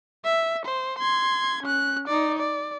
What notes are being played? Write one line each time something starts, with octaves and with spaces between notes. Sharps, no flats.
E5
C5
C6 G#6
C#4 F#6
D#4 D5
D5